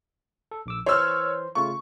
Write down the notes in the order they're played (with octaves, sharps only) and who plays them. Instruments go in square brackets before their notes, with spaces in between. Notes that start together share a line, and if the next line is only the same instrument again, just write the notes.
[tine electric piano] A4
A#1 D6 E6
[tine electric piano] E3 C5 C6 [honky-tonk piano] C#5 E6 F6
[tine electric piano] C#3 A3 F4 [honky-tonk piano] C#6